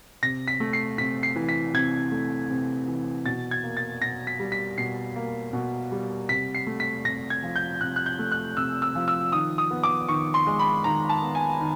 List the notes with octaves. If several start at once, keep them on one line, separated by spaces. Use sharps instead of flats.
C3 A#6
B6
A3
C7
C3 B6
C7
E3
B6
C3 G#6
A3
C3
E3
B2 A6
G#6
A#3
A6
B2 A#6
B6
G3
B6
B2 C7
A#3
B2
G3
C3 B6
C7
A3
B6
C3 A#6
G#6
F3
G6
C3 F#6
F#6
G6
A3
F#6
C3 E6
E6
F3
E6
D#3 D#6
D#6
B3
D6
D#3 C#6
C6
G#3
B5
D#3 A#5
A5
B3
G#5
D#3